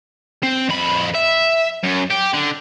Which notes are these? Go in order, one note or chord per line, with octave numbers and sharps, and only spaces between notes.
C4
F2 B5
E5
F#2
G4
D3